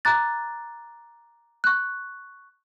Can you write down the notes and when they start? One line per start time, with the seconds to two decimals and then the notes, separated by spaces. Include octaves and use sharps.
0.05 A#5 D6 F#6 A6
1.64 C#6 F#6